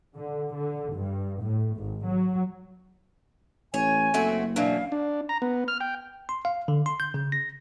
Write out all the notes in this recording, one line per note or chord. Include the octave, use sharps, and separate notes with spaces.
D3
D3
G2
A2
G#1
F#3
A1 C#5 G#5
F#1 A3 C4 F#4
B2 E3 F#3 D4 F5
D4
A#5
B3
F6
G5
C6
F5
D3
C6
G6
C#3
A#6